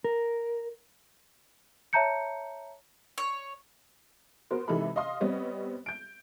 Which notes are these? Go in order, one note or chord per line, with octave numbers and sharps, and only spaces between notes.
A#4
C#5 E5 A5 A#5 G6 C#7
C#5
B3 F#4 A#4 C5
C3 E3 G#3 D#4 A4 B5
D#5 F5 C6 D#6
G3 B3 C4 C#5 D#5
G6 D7